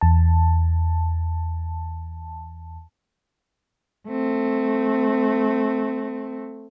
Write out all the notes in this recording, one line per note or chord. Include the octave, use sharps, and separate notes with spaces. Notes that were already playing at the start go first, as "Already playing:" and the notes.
E2 A5
A3 C4